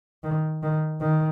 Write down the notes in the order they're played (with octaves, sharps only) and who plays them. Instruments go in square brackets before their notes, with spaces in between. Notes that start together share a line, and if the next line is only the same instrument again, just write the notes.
[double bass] D#3
D#3
D#3